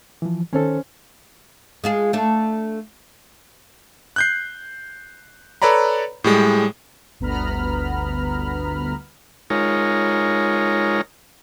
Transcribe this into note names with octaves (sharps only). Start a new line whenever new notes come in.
E3 F3
D#3 C#4 A4 C5
G#3 F4 G#4
A3 D4
F#6 G6 C7
A4 B4 C#5 D5 A#5 B5
A2 G3 G#3
G1 D2 B3 A#5 B5 F6
G#3 D#4 F4 A#4 C#5